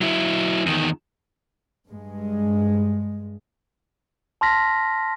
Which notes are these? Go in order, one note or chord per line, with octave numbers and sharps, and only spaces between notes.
F#3 E4
E2 D#3
G2 G#3
A5 C6 F6 A#6 B6